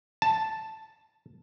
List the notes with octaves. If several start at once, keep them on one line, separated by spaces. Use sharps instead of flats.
A5